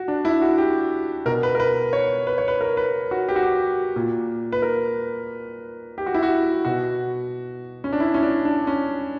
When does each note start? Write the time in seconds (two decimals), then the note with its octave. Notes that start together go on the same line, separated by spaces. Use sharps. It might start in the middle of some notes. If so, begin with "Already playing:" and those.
Already playing: F#4
0.08 D4
0.25 E4
0.42 F#4
0.58 G4
1.26 B2 A#4
1.43 B4
1.55 A#4
1.60 B4
1.93 C#5
2.27 B4
2.38 C#5
2.48 B4
2.61 A#4
2.77 B4
3.11 F#4
3.29 G4
3.36 F#4
3.43 G4
3.96 A#2
4.52 B4
4.62 A#4
5.98 G4
6.06 F#4
6.14 E4
6.23 F#4
6.65 B2 F#4
7.84 C#4
7.93 D4
8.00 E4
8.14 C#4
8.23 D4
8.45 D4
8.67 C#4